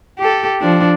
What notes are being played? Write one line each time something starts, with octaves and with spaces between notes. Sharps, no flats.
G4 A4
F3 D4